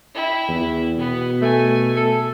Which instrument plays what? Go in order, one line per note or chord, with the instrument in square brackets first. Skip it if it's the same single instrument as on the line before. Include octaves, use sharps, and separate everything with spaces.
[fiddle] E4 G5
[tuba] E2
[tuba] B2 [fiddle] B3
[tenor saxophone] A3 [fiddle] G#5
[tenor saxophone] A4